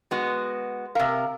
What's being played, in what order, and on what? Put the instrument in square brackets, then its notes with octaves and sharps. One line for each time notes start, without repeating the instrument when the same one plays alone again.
[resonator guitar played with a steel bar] G#3 B3 F#4
[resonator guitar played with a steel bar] C3 A#4 [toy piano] F5